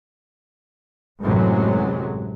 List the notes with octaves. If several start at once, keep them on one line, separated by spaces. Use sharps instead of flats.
A1 F#2 A2 C3 F#3 G#3